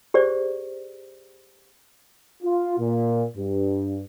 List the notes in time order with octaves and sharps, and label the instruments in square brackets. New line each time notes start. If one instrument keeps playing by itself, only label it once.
[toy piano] G4 G#4 C5 D5
[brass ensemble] F4
A#2
G2